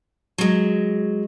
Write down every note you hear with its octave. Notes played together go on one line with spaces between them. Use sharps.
F#3 G#3